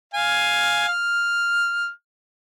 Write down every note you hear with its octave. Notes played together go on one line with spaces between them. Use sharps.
F5 G#5
F6